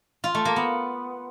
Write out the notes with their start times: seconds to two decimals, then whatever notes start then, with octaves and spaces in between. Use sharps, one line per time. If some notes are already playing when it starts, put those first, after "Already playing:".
0.24 F4
0.35 A3
0.45 A#3
0.56 B3